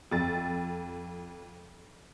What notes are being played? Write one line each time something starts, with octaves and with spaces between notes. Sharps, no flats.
F2 A6